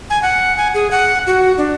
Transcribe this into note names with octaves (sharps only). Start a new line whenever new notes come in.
G#5
F#5
G#5
G#4
F#5
F#4
D4